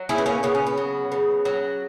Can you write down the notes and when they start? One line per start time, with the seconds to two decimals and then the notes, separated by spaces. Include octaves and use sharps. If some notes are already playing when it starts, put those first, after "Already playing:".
Already playing: F#3
0.09 C#3 C#4 E4
0.18 B3
0.26 A#3 C#4
0.43 C#3 B3
0.55 C#4
0.67 B3
0.78 F#3
1.12 C#3
1.45 F#3